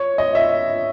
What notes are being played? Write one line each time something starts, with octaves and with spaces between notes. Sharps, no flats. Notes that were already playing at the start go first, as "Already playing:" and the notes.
Already playing: C#5
D#5
E5